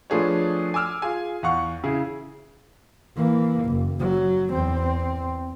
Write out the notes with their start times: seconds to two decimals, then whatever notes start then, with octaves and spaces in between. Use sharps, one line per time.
0.10 F3 A3 D4 G#4 B4 C#5
0.74 G#5 D6 E6 F6
1.02 F4 G#4 G#5
1.43 E2 F5 F#5 C#6
1.83 C#3 E4 G#4
3.17 E3 A#3
3.65 F#1
4.00 F#3
4.50 E2 C4